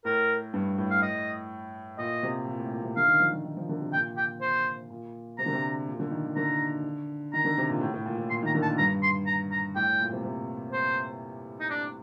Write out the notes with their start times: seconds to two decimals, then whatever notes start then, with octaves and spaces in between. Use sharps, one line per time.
0.05 A2 A#4
0.54 G2
0.78 A2
0.91 F5
1.02 D#5
1.98 A#2 D#5
2.23 C3
2.48 A#2
2.60 A2
2.72 A#2
2.84 C3
2.97 D3 F5
3.08 D#3
3.20 F3
3.33 F3
3.45 D#3
3.57 F3
3.69 D3
3.81 C3
3.93 A#2 G5
4.17 G5
4.41 C5
4.90 A#2
5.38 C3 A#5
5.46 D3
5.53 C3
5.88 A#2
5.99 D3
6.11 D#3
6.24 D#3
6.36 D3 A#5
7.34 D#3 A#5
7.45 D3
7.58 C3
7.69 A#2
7.81 A2
7.94 A2
8.06 A#2
8.18 A2
8.30 A#2 C6
8.43 D#3 A#5
8.55 D3
8.63 A5
8.66 A#2
8.78 G2 A#5
9.03 C6
9.27 A#5
9.52 A#5
9.76 A2 G5
9.88 A2
10.00 A#2
10.12 C3
10.24 C3
10.72 C5
11.60 D#4
11.70 D4